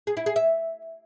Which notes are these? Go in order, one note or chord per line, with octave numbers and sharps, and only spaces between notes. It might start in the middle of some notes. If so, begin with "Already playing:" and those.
G#4
E4
G#4
E5